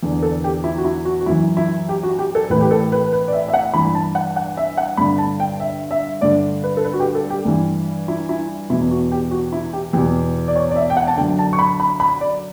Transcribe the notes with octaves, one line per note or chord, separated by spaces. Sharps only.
E2 D3
A4
G4
E4
F#4
E4
F#4
F#4
F#2 E3 E4
E4
G4
F#4
G4
A4
A2 E3 B4
G4
A4
B4
B4
D5
E5
E5
F#5
G2 E3 B5
B5
A5
F#5
F#5
E5
F#5
G2 D3 B5
A5
G5
E5
E5
G2 D3 D5
B4
A4
B4
F#4
G4
A4
G4
G2 E3
E4
E4
E2 B2 E4
F#4
G4
F#4
E4
G4
E2 B2 G4
D5
C#5
D5
E5
G5
F#5
A5
F#2 D3 G5
A5
C#6
B5
B5
B5
D5